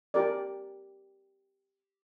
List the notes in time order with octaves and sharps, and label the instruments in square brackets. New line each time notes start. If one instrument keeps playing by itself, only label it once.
[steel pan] G4 A#4 D5